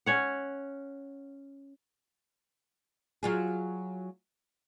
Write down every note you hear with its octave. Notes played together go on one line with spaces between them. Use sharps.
C#4 C#5 F#5
F#3 F4 G#4